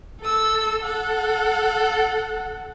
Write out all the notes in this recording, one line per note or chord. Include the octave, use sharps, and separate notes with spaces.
A4 E6
A4 F#5